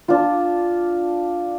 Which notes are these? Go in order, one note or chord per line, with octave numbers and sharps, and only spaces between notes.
D4 F4